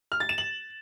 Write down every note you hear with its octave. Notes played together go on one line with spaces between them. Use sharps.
F6
A6
E7
F#7